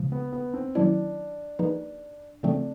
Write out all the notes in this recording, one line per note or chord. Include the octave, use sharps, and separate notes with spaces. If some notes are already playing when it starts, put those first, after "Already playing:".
Already playing: C#3 F3 G#3
B3
B3
C4
D#3 F#3 A#3 C#4 D4 E4
F3 A#3 D#4 G#4 B4
C#3 F3 A3 C4 D4